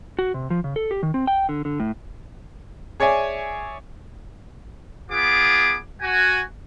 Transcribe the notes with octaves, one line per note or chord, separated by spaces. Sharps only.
F#4
C3
F3
C#3
A4
G4
D#3
C4
G5
D3
D3
A2
G#4 C#5 D5 E5 G#5
B3 F4 G#4 D6
F#4 G#5